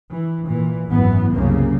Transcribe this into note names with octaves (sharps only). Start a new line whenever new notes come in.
E3
A#2 E3
G#1 F#2 E3 B3
C2 F#2 C#3 A#3